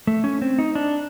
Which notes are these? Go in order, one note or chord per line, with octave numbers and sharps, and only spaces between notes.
A3
C#4
C4
D#4
D4